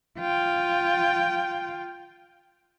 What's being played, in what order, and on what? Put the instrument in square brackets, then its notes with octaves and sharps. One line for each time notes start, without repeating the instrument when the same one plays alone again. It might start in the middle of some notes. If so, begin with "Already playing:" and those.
[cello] F4 G5